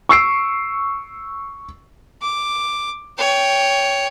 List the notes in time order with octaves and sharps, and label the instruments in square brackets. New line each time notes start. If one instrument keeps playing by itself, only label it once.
[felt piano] C#6 E6 C7 D7
[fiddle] D6
C#5 G5